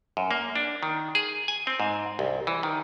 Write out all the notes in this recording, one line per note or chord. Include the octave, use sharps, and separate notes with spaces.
F#2
A#3
D4
D#3
G#4
G#5
C4
G#2
C2
E3
D#3